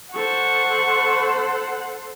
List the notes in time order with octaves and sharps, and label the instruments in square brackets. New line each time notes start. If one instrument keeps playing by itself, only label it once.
[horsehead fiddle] A4 C5 [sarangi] F#5 [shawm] C#6